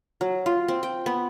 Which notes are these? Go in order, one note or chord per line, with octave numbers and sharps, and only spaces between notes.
F#3
F4
C4
G5
B3